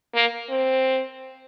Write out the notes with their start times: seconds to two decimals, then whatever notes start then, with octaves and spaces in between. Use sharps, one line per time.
0.14 A#3
0.49 C4